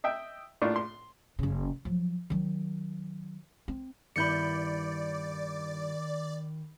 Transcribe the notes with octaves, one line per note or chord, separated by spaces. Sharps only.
D#5 E5 G5
A2 A#3 D4 F4 C#6
C6
F#1 C#3
F3 F#3
D#3 F#3
C4
G2 D#3 B3 E4 D5 B5 G6 C#7